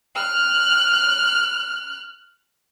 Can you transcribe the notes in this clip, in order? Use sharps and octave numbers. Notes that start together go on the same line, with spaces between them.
F6 F#6